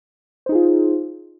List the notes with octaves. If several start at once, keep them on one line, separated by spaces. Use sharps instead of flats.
D#4 F4 G#4 C5